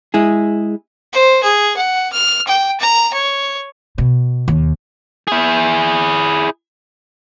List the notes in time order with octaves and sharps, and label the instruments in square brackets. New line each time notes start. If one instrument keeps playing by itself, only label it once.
[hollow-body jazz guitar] G#3 E4 G#4
[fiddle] C5
G#4
F#5
F6
G5
A#5
C#5
[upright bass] B2
D#2
[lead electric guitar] E4 G#4